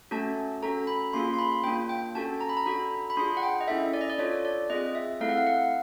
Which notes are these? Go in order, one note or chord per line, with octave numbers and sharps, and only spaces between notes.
A3 C#4 F#4 A4 A5
C#4 F#4 A4 A#5
B5
A#3 C#4 F4 G#4 C6
C6
B5
A#3 D4 F4 G5
G5
C#4 F#4 A4 A5
A#5
B5
A#5
D4 F#4 A4 B5
B5
D4 F4 G#4 C6
F#5
G5
D#5
C#4 E4 A4 E5
D5
D#5
D5
D4 F4 A4 C#5
D5
C4 F4 G#4 D#5
E5
A3 C4 E4 A4 F5
F#5
F5
F#5